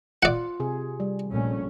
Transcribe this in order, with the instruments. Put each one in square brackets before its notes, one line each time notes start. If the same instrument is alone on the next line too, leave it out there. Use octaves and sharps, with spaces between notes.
[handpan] F4 [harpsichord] D5 F#5
[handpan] C3 G#4
G3
[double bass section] A#1 A3 C#4